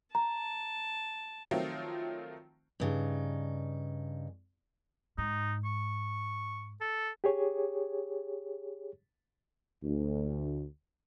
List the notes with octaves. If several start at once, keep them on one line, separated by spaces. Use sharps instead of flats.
A5 A#5
D#3 F3 F#3 A3 C4 F4
G2 C#3 D#4
G#2 D#4
C#6
A4
G4 G#4 C#5
D2